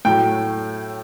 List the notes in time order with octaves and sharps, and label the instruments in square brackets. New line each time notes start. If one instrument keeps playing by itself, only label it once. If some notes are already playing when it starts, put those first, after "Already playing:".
[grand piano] A2 F#3 A3 G5